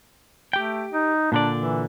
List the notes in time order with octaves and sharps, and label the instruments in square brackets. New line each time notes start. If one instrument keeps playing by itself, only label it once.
[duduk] A3 [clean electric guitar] G4 G5
[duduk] D#4
[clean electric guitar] A#2 D3 D5 [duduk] D4
[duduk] E3